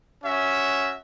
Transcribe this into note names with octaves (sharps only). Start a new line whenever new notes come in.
C#4 F#4 E5